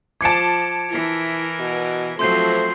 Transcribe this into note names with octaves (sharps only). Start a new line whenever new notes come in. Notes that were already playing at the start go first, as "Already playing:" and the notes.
F3 A5 D6 G#6 C#7 D7
E3 E4 A#4
B2
F3 F#3 A3 C4 C6 G6 C7